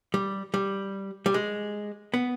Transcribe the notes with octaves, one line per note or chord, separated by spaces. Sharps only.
G3
G3
G3
G#3
B3